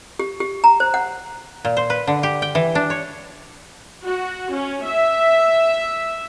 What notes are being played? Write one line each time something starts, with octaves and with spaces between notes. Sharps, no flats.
G4
G4
A#5
C5
F#5
A#2
C5
B4
D3
G4
G5
E3
D4
C#5
F#4
C#4
E5